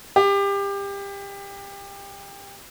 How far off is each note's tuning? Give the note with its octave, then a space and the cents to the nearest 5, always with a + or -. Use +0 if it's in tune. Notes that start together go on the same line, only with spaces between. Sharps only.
G4 +25